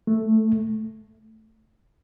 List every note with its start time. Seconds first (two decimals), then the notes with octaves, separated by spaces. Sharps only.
0.07 A3